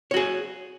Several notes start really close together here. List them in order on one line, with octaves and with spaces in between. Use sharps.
C#5 F#4 G#4